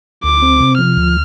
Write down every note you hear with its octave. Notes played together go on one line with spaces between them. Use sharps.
D2 D6
C4
C3
F3 F6
D2